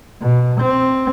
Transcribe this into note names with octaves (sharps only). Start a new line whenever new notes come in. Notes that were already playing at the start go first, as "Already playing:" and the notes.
B2
C4